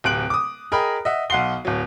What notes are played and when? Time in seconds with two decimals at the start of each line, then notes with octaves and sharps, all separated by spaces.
0.04 D1 C3 F#6 D7 F#7
0.30 D6 D#6
0.72 G#4 A#4 D#5 G5 B5
1.05 D#5 E5 F#5
1.30 B1 F5 F#5 C6 C7 G7
1.65 D1 F#3